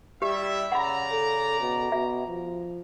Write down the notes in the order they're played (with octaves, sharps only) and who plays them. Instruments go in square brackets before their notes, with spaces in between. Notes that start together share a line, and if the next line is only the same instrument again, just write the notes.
[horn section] G3 E4 E5 [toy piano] G4
[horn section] C#3 D5 A#5 [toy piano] F#5 B5
[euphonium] A4
B2
[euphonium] B2 [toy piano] E5
[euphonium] F3